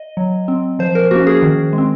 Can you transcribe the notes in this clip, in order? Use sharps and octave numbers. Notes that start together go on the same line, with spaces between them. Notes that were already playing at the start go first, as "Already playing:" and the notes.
Already playing: D#5
F#3
C4
F3 C5
A#4
A#3 C#4 F#4
G#4
D#3
G#3
C4